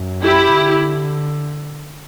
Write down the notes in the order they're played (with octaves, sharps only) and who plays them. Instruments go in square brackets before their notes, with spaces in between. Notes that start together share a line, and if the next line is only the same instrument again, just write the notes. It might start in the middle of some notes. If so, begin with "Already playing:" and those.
Already playing: [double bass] F#2
[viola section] E4 G4
[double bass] D3